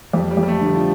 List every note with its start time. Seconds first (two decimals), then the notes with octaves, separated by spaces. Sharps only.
0.13 F2 G3
0.31 G3
0.37 F2
0.43 G3
0.48 A3
0.60 D3
0.66 G3
0.75 F3